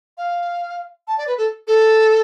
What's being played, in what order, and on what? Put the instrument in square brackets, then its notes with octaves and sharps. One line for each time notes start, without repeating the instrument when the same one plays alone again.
[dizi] F5
A5
D5
B4
A4
A4